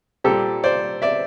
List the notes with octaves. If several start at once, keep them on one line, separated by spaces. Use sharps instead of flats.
A#2 G3 C4 G4 A4
C5 D5
D5 E5